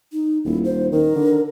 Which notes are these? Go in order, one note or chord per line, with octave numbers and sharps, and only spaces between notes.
D#4
D#1 E4
C5
D#3 A#4
D3